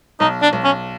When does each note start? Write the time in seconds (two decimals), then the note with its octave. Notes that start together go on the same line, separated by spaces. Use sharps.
0.20 B1 D#4
0.42 D4
0.53 B1
0.64 C#4